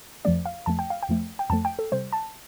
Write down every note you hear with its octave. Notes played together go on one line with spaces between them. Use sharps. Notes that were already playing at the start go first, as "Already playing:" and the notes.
F2 F3 A3 D5
F5
F2 F3 A3 A5
G5
F5
G5
F2 F3 A3
G5
F2 F3 A3 A5
G5
A4
C3 G3 C5
A5